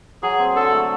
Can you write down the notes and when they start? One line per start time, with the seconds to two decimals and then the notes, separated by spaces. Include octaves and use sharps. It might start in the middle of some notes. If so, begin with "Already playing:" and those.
0.23 F#3 G#4
0.40 C4
0.56 D3 A4
0.72 A3